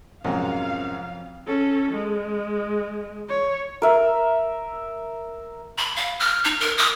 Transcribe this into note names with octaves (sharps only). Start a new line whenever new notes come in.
F2 G#2 C3 F#3 C4 C#4 A#4 F5
C#4 A4
G#3
C#5
A#4 E5
B5
F5
F6
D#4
A#4
D#6